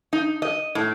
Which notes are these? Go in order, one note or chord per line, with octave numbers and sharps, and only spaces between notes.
D#4
D#5
A2